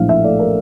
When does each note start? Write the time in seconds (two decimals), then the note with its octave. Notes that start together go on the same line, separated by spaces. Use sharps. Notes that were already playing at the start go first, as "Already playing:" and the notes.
Already playing: A#1 A2 E3 F5
0.09 E5
0.24 A3 D5
0.39 A#4